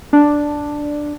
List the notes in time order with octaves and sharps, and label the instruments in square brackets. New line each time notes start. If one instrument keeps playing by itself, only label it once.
[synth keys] D4